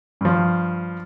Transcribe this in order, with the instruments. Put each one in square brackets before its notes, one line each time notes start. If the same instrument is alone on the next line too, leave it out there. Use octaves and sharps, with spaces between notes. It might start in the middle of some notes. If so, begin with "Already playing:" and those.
[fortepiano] G2 F3